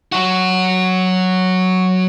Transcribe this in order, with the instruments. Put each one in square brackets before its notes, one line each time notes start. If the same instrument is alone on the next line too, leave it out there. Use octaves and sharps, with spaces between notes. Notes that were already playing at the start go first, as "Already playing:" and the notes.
[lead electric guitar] F#3 F#4